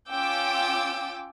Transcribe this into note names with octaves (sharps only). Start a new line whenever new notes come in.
C#4 F4 G5 D6 E6